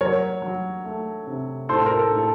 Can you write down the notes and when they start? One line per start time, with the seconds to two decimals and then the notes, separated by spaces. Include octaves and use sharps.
0.01 F#3 A#4 C#5
0.42 F#3
0.85 A3
1.27 C3
1.69 A2 A4 C5
1.86 A#4
1.97 A4
2.11 A2
2.19 A4